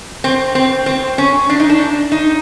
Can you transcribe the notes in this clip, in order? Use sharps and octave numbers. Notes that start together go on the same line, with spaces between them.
C4
C4
C4
C#4
D4
D#4
D4
D#4